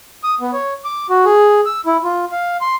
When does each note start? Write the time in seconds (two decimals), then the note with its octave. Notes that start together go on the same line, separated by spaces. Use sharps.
0.24 D#6
0.41 B3
0.53 C#5
0.85 D6
1.10 F#4
1.25 G#4
1.66 E6
1.86 E4
2.04 F4
2.32 F5
2.61 C6